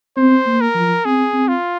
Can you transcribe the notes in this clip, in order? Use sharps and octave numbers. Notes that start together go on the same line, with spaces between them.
C4 C5
A#3
A#4
F3
C4 G#4
C4
F4